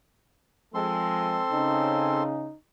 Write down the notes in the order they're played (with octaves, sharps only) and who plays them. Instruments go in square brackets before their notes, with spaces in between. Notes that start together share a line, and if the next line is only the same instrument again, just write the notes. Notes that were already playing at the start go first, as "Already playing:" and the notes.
[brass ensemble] F3 G#3 [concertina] C4 A4 C6
[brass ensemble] C#3 [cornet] D#4